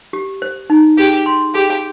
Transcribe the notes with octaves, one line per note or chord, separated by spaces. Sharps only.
G4
C5
D#4
G4 G#4
C6
G4 G#4